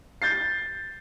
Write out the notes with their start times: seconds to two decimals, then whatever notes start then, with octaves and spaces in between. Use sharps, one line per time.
0.22 G6 A6 C7